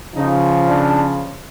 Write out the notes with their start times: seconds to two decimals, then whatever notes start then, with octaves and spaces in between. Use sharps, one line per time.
0.15 C#3 F3 D#4
0.69 D4